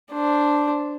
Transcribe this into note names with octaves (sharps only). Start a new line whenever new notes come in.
D4 C5